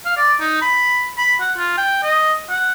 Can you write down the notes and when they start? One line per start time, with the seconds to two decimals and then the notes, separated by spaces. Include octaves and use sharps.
0.05 F5
0.17 D5
0.40 D#4
0.62 B5
1.18 B5
1.40 F#5
1.57 F4
1.77 G5
2.03 D#5
2.50 F#5